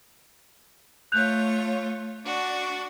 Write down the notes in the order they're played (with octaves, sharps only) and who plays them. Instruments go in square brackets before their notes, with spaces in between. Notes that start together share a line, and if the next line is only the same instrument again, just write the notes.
[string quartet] A3 F4 C#5 [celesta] F#6 G6 F7
[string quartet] D4 F#4 D5